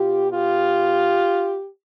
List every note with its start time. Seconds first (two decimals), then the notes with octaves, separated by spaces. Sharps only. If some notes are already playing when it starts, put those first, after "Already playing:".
Already playing: B2 F4 G4
0.31 F4 G4